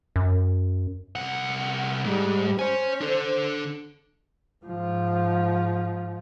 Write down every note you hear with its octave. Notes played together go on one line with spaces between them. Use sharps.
F#2
C2 F#5
G#2 G3
C5 C#5 G#5
D4 A4
G#2 F3